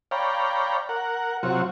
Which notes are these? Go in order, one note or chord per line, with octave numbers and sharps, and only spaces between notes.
C#5 D5 F5 G5 A#5 B5
A#4 F#5
C3 F#3 F4 F#4 C#6